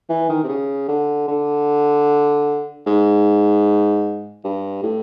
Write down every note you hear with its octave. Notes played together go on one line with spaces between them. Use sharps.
E3
D#3
C3
C#3
D3
D3
G#2
G2
A2